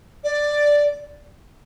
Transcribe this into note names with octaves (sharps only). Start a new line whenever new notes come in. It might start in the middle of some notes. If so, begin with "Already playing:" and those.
D5